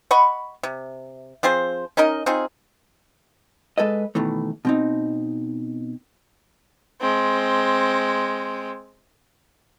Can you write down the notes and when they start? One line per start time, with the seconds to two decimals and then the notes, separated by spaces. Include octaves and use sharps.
0.11 D#5 F#5 B5 C#6
0.63 C3
1.43 F3 C4 G#4 C5
1.97 C#4 D#4 A#4 D#5
2.26 C4 D#4 F4 G#4
3.78 G#3 A4 B4 D#5
4.15 B2 D#3 E3 A3
4.65 B2 C4 D#4
7.00 G#3 C4